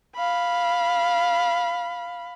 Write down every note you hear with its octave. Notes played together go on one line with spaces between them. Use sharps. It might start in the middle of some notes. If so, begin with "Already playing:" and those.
F5 B5